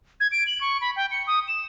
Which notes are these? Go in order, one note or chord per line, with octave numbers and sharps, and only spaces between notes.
G#6
D7
F#7
C#6
B5
G5
C#7
D#6
E7